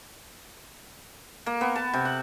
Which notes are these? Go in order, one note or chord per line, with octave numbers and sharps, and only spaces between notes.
A#3
B3
A5
C3
F#5